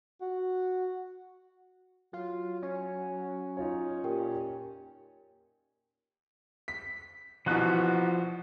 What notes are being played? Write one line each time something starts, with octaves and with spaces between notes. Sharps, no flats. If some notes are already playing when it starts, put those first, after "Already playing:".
F#4
F#3 F4
C#4
D#4 F4 C#5
A#2 G4 A#4 G5
B6
C2 B2 E3 F3 F#4 F#6